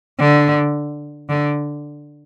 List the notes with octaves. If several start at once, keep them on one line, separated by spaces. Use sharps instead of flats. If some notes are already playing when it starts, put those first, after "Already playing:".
D3
D3